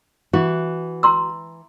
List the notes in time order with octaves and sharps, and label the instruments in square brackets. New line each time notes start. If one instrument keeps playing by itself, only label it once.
[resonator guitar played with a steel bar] E3 [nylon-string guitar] F#4
[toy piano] A#5 C6 E6